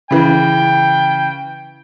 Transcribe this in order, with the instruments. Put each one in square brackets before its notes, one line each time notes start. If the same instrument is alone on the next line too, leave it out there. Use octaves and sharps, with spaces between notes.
[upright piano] C#3 E3 [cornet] G5